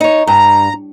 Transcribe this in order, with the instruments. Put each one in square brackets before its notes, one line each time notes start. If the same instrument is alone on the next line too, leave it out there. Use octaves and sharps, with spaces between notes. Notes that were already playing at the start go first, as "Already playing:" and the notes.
[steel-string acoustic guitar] D#4 C#5
[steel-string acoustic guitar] G2 [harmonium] A#5